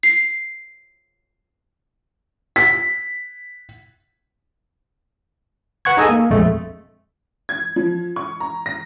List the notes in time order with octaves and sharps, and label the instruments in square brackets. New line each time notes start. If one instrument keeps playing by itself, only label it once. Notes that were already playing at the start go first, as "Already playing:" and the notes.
[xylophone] C7
[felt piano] B6
[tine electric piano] B4 F#5 C#6 G#6
D#4 G#4 A4 D#5 G#5
A#3
A#1 F2 G#3 A3
[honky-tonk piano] G#6
F3
C#6
A#5
A#6